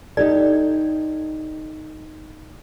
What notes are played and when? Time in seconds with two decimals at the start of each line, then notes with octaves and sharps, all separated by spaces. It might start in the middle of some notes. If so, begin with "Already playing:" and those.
0.17 D#4 G4 A4 D5